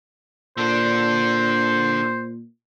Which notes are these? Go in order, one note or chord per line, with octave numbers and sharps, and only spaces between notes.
A#2 D3 D4 C5